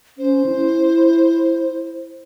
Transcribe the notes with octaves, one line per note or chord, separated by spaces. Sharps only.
C#4 C5
E4